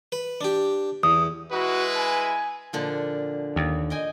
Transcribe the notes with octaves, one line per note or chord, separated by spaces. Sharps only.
B4
D4 G4
E2 D#6
G#3 E4 F#4 B4
G#5
A#2 D3 F3
D#2
D#5 G5 G#5